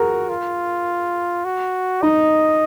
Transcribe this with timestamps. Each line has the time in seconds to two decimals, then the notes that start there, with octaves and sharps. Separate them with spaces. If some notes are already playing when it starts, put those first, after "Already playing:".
Already playing: F#4 G#4 A#4
0.29 F4
1.45 F#4
2.02 D#4 D#5